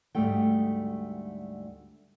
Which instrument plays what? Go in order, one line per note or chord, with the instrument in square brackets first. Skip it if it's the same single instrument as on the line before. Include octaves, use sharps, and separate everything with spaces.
[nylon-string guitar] D2 G#2 G3 A3 G5